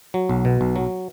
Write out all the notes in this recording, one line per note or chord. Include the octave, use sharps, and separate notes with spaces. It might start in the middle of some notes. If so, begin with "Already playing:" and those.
F#3
B1
B2
B1
F#3